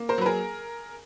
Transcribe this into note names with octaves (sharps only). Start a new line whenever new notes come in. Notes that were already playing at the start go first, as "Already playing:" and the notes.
Already playing: A#3
A#4 C5
F#3 B4
G#4 A#4